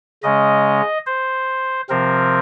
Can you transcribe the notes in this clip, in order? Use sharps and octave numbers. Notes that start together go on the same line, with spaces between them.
C#3 G#3 C#4 D#5
C5
C3 F3 C4 A#4